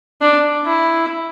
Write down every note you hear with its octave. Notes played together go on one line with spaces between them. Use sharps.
D4
E4